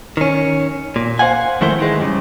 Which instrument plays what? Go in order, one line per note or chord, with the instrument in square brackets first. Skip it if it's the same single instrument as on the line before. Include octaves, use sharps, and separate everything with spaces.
[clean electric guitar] D#3 C#4
A#2
C5 D5 F5 F#5 G#5
F2 D#3 G#3 A3 E4 C5
D#3 E3 G#3
G2 C#3